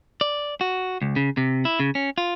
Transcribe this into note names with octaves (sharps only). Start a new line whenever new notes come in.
D5
F#4
C#2
C#3
C3
E4
C#3
C#4
F4